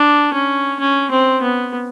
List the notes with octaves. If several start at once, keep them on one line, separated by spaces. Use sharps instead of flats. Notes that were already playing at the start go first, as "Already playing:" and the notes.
Already playing: D4
C#4
C#4
C4
B3